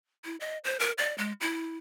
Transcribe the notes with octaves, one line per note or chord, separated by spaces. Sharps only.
E4
D#5
C5
A#4
D5
G#3
E4